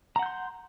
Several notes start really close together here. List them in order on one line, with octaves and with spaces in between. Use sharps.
A#5 F#5 G6 C6